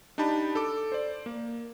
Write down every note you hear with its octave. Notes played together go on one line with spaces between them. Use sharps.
D4 D#4 G4 A5 B5
A4 D6
C5 D5
A#3